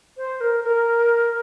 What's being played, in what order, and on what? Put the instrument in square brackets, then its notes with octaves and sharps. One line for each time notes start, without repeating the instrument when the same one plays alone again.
[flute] C5
A#4
A#4